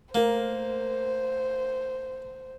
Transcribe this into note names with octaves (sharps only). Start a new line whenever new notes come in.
A3 A#3 A#4 C5